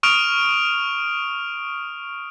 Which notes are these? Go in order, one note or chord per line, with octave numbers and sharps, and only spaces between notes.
C#6 D#6 F6 D7 F7